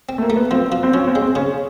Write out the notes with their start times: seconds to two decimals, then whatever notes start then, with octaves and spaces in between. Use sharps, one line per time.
0.09 C4
0.18 A3
0.22 A#3
0.30 A3
0.36 B3
0.51 F3 C4
0.72 F3
0.83 C4
0.93 F3 C#4
1.08 C4
1.15 G#3
1.22 C4
1.35 C#3 C#4